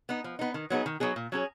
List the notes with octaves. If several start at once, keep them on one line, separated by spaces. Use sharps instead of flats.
B3 D#4
F3
B3 D#4
D#3
F#3 B3 D#4 G#4
D#3
F#3 B3 D#4 G#4
A#2
F#3 C#4 G#4